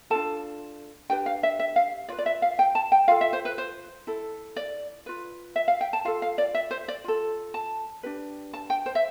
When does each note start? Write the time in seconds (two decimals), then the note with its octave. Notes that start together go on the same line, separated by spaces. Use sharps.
0.10 D4 F4 A4 A5
1.10 D4 G4 B4 G5
1.26 F5
1.43 E5
1.60 E5
1.76 F5
2.08 F4 B4 D5
2.18 D5
2.26 E5
2.42 F5
2.59 G5
2.75 A5
2.92 G5
3.08 F4 A4 F5
3.21 E5
3.33 C5
3.45 B4
3.58 C5
4.07 E4 A4
4.56 D5
5.06 F4 B4
5.56 E5
5.68 F5
5.81 G5
5.93 A5
6.05 F4 A4 F5
6.22 F5
6.38 D5
6.55 E5
6.71 C5
6.88 D5
7.04 F4 A4
7.54 A5
8.03 D4 G4 B4
8.53 A5
8.70 G5
8.86 C5
8.95 E5